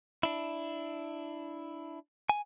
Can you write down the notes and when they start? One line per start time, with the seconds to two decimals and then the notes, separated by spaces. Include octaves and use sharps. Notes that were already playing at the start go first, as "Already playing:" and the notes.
0.23 D4 E4
2.29 G#5